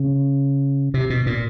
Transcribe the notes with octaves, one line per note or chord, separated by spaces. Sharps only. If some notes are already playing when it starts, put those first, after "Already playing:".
Already playing: C#3
C3
B2
A#2